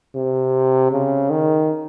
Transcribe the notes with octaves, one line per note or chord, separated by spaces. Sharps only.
C3
C#3
D#3